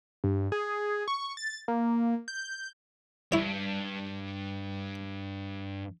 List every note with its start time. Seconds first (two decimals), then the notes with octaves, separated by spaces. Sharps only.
0.24 G2
0.52 G#4
1.08 C#6
1.37 A6
1.68 A#3
2.28 G6
3.32 G2 E4 C#5